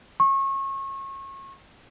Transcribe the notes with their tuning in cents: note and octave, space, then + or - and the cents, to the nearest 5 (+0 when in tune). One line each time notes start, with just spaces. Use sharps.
C#6 -30